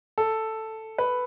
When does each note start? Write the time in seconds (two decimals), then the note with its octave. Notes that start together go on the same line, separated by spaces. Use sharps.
0.18 A4
0.98 B4